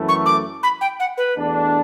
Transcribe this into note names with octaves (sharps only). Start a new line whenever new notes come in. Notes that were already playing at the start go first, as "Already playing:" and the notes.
Already playing: F#2 E3 A3
C#6
D6
B5
G5
F#5
B4
E2 B2 A3 D4